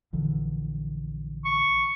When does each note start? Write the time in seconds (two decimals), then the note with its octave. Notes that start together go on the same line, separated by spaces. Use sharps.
0.13 A#1 D3 E3
1.45 C#6